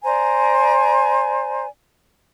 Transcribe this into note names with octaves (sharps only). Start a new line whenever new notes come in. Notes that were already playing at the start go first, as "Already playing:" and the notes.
C5 D5 G#5 A#5